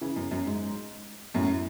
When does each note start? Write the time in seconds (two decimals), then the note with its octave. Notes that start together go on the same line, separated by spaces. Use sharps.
0.01 C#3 E3
0.16 F#2
0.31 F#2
0.46 G#2
1.34 F#2 A2